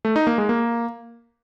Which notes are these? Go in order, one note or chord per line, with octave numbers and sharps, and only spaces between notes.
A3
D#4
A#3
G#3
A#3